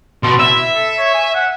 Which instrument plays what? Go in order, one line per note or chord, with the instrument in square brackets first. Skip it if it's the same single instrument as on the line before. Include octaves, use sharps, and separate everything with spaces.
[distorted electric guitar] B2 [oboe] C6
[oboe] E4 [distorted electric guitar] E5
[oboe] A4
C#5
G#5
F#5